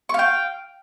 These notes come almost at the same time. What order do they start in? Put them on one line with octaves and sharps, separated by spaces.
C#6 F5 G5